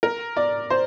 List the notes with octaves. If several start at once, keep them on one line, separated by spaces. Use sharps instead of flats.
A#4
D5
C5